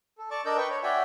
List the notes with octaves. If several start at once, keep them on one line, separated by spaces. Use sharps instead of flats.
A4
D5 A5 C#6 D6
D4 A#4 D5 D#5 E6 G6
B4 G5 C#6
C#5
F#4 D5 E5 G5 G#5